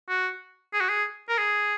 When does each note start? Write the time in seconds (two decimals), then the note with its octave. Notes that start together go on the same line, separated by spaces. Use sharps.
0.09 F#4
0.73 G#4
0.80 F#4
0.89 G#4
1.29 A#4
1.38 G#4